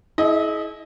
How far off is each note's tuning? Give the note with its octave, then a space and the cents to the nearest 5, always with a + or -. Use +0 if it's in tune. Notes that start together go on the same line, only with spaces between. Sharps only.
E4 -30 G#4 +45 D#5 +0